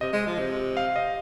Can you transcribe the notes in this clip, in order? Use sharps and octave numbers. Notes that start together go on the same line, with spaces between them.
C3 D#5
G#3
F3
C3
F5
D#5